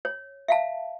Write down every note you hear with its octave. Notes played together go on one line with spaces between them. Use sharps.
C#5
E5 F5 A5